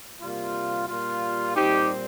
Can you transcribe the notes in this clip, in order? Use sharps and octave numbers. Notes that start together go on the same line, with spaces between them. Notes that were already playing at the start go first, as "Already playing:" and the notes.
C3 G3 A#3 F4
A#2 G3 A#3 F4
A#2 G3 C4 D#4 G4